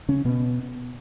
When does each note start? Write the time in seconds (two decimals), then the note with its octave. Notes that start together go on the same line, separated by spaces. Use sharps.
0.08 C#3 C#4
0.25 B2 B3